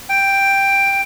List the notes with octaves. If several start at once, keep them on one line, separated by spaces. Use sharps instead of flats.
G5